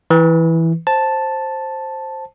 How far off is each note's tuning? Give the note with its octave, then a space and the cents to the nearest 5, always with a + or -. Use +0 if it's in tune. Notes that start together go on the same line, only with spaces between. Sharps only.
E3 -5 B4 +0
C5 +10 A5 +0